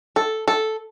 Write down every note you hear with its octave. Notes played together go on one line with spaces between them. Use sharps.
A4
A4